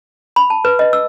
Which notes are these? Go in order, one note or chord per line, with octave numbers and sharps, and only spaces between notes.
B5
A5
B4
D#5
E6